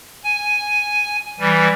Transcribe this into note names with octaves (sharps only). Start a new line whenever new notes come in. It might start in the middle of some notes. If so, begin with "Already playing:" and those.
G#5
E3 G3